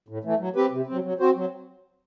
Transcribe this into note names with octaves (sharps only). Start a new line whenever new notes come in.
A2
E3 A3
F#3
C4 G4 B4
C3
F#3 C4
F#3
C4 F#4 C5
F#3